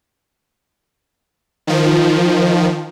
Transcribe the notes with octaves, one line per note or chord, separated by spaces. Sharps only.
D#3 F3